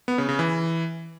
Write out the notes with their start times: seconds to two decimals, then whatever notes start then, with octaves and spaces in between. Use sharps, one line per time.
0.08 B3
0.18 C#3
0.29 C#3
0.39 E3